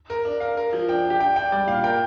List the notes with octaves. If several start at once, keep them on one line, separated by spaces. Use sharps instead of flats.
A#4
D4
A#4 F5
A#4
F3
D4 G5
D4
G4
D4 G5
D4 G5
G3 D5
A#2 F5
A#4 G5